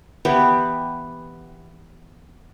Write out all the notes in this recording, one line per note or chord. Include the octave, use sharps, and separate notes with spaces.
E3 B3 G4